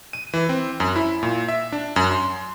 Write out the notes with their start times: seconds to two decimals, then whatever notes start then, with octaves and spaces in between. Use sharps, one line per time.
0.13 D#7
0.34 E3
0.49 C4
0.80 F#2
0.96 E4
1.23 A#2
1.48 E5
1.72 D4
1.96 F#2
2.11 C6